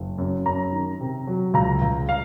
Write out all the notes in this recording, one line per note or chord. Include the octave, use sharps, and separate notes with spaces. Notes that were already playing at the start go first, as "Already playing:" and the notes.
Already playing: F#1
F#2
F#2 A#5
D#3
C3
F#3
C#2 A#5
C#2
F5